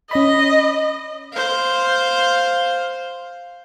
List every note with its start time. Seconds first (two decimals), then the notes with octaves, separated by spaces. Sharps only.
0.11 C#4 D#5 B5
1.33 C5 F5